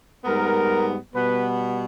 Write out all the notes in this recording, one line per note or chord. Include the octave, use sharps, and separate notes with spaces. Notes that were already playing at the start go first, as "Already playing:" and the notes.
G#2 G3 B3 A#4
B2 G3 B3 B4